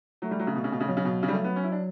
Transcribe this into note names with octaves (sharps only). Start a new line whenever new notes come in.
F#3 A3
G3
F#3
C#3
B2
C#3
B2
C#3
B2 F#3
C#3
B2
C#3
G3
A3
B3
C#4
E4
D4